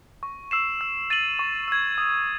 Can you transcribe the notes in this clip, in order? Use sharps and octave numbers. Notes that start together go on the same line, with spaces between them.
C#6
E6 C7 E7
E6
A6 D#7 F#7
C#6
E6 G#6
D#6